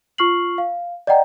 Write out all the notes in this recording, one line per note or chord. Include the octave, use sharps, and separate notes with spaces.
F4 C#6 F6 C7 F#7
F5
D5 D#5 F#5 G5 A#5